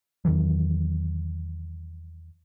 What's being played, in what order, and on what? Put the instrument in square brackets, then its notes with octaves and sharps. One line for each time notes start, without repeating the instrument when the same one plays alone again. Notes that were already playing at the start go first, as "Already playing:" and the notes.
[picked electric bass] E2 D#3 E3 F#3